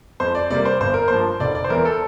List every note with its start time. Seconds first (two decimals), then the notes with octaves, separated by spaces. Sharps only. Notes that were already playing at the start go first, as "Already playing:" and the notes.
0.20 F2 C5
0.35 D5
0.50 C3 G3 A#3 D5
0.65 C5
0.80 G1 C5
0.94 A#4
1.08 G2 F3 A#3 C5
1.40 F1 D5
1.55 D5
1.64 C5
1.70 E2 E3 A#4
1.85 A4